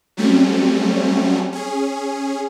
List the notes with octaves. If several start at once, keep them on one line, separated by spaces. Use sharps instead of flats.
F#3 G3 A3 C4 C#4
C#4 G#4